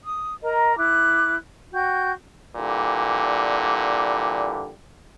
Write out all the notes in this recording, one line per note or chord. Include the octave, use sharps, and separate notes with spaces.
D#6
A#4 D#5 A#5
E4 D6 F#6
F#4 G5 G6
A#2 D3 E3 G3